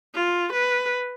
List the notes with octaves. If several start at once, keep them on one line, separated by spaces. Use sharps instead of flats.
F4
B4